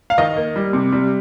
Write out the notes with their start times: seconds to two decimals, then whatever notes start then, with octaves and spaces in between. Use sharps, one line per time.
0.10 F5
0.18 D#3 D#5
0.36 A#3
0.56 G3
0.73 C3
0.92 G3